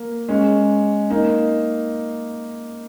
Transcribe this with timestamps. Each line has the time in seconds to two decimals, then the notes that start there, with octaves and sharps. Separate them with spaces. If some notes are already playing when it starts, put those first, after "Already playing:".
Already playing: A#3
0.28 G#3 C#4
1.10 A#3 D#4